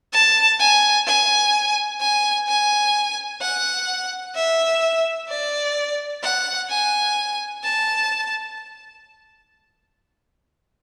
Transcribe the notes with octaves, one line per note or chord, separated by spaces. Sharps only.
A5
G#5
G#5
G#5
G#5
F#5
E5
D5
F#5
G#5
A5